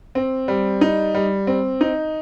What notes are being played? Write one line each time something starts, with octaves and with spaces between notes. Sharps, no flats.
C4
G3
D#4
G3
C4
D#4